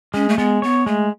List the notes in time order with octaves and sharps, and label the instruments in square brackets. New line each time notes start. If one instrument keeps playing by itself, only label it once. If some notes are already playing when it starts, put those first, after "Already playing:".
[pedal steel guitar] G#3 [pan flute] C#4
[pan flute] A3
[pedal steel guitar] G#3 [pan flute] B3
[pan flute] B3 [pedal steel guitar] C#5
[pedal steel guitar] G#3 [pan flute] A3